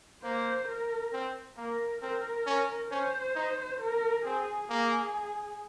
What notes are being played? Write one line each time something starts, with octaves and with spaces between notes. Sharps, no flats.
A#3 C5
A#4
C4
A#3 A#4
C4 A#4
C#4
C#4 C5
D#4
A#4
C4 G#4
A#3 G#4